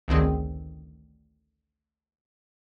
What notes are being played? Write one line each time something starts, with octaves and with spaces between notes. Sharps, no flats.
A1 D2 D#3 C4 G#4